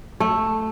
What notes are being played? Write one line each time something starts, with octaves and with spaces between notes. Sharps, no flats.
A3